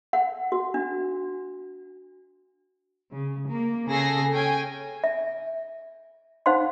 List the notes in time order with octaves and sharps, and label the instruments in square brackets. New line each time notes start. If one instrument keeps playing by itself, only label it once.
[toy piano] F#5
F#4
D4
[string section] C#3
A#3
C#3 G#4 A4 G#5 A#6 C7
C#4 G5 G#5
[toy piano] E5
D#4 C5 F5 F#5 C6